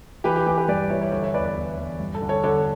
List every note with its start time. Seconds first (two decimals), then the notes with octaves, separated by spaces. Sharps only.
0.24 E3 G4 B4
0.36 G4
0.46 E3 G4
0.57 G4 B4
0.68 G2 B4 D5
0.90 E3 C#5 E5
1.01 C#5 E5
1.12 D3 C#5 E5
1.23 C#5 E5
1.34 E2 B4 D5
1.45 B4 D5
1.56 E2
1.78 E2
1.99 G2
2.15 A4
2.22 D3
2.29 A4 C#5
2.43 D3 A4 C#5